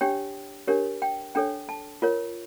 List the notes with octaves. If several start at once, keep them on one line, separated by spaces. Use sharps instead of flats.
D4 G4 C#5 G5
D4 G4 A#4 C#5
G5
D4 A4 C#5 G5
A5
F4 A#4 C#5